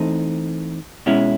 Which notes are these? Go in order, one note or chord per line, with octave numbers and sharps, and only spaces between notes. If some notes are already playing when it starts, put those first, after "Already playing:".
Already playing: E3 A3 C4 D#4
B2 G#3 C#4 E4